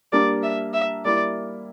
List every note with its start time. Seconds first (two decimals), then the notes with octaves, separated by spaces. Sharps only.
0.12 G3 A#3 D4 D5
0.43 E5
0.73 E5
1.05 G3 A#3 E4 D5